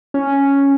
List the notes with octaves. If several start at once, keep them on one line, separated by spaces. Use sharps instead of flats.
C#4